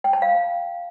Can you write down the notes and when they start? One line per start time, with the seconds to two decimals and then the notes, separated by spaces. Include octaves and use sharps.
0.04 G5
0.13 A5
0.22 F5